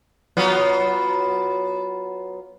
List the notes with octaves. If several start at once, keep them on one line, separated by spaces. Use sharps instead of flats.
F#3 B3 F4